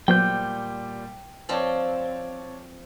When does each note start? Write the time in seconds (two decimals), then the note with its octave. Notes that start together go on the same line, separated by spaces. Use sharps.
0.08 A#2 F#3 G3 B3 C5 G5 G6
1.49 F3 C4 C#5 D5 A5